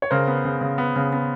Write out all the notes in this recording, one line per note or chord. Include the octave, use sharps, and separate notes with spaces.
C#5
C#3 A#4 C5
B3
C#3
C#3
B3
C#3
B3